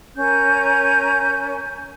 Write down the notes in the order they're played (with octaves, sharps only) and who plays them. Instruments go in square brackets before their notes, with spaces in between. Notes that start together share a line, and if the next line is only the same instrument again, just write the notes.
[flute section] C#4 A#4 G6